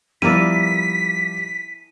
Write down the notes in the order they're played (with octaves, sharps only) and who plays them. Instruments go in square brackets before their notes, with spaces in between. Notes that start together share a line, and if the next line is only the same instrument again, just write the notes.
[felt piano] F3 G3 B3 [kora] E4 A#4 D5 [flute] B6 [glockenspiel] D#7